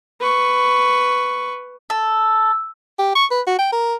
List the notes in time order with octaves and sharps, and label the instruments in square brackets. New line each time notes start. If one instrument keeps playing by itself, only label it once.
[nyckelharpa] B4 C#6
[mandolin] A4
[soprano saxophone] G4
C#6
B4
F#4
G5
A#4